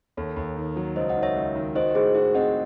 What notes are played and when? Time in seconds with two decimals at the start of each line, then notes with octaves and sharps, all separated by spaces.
0.17 D#2 A4 C#5
0.36 D#2
0.57 D#3
0.76 F#3
0.96 C#2 C5 D#5
1.09 D#5 F#5
1.16 D#3
1.23 C#5 E5
1.36 C#2
1.55 D#3
1.75 F#4 C5 D#5
1.95 A2 G#4 C5
2.14 F#4 G#4
2.34 C4 D#5 F#5